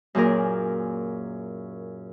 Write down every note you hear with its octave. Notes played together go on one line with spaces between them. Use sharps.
F#2 A#2 G#4 A#4